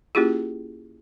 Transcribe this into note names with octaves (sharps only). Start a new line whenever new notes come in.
A#3 C#4 E4 F4 G4 G#4